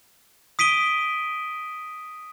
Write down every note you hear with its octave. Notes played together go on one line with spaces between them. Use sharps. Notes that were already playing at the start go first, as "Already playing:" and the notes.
D#6 B6 D7 D#7 G7